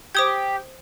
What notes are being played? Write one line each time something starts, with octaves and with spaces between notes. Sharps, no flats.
G4 C5 D#6 G#6